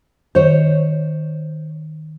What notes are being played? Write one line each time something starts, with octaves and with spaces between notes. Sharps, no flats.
D#3 C5 C#5